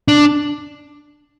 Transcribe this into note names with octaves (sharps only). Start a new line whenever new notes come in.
D4